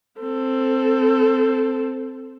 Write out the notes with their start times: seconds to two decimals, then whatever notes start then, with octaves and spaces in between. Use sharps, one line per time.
0.21 C4 A4